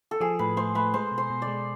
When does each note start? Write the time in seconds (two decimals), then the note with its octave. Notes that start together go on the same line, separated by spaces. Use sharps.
0.11 A4
0.21 F3 G#4
0.39 A2 B4
0.57 A3 C5
0.75 A3 B4
0.94 G#3 C5
1.12 B2
1.18 C5
1.30 B2
1.42 D5
1.48 G#3